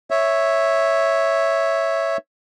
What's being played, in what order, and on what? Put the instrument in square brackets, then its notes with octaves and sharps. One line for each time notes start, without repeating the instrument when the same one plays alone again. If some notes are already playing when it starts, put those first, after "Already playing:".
[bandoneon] C#5 E5